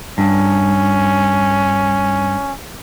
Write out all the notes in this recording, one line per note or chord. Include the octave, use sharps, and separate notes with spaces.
G2 C#4